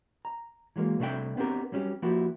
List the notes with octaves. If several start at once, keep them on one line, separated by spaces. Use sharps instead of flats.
A#5
E3 F#3 G#3 A#3
C2 C3 A3 D4 E5 G5
B3 C4 D4 G4 A#4
F#3 G3 C#4 F#4 G4
F3 A#3 E4 F#4 G4